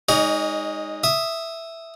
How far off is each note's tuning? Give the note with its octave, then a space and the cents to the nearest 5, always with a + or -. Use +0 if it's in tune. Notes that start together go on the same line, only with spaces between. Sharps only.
G#3 -20 D#4 +5 C#5 +40
E5 +0 D#6 +0